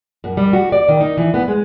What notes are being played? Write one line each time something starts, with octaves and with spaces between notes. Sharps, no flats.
F#2
G3
F#4
D5
D#3
D#4
E3
B3
G#3